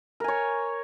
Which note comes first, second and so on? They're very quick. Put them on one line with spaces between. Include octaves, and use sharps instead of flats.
A#4 G#5 C#5